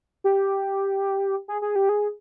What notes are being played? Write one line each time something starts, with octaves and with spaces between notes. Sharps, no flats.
G4
G#4
G#4
G4
G#4